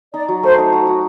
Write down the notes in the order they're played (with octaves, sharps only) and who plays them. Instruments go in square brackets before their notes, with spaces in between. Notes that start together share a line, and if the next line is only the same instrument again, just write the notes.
[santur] D#4 [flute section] D5
[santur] F#3
[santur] A3 [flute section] C5
[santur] D#4
F#4
F#4